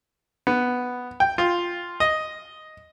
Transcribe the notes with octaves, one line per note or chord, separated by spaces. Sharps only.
B3
G5
F4
D#5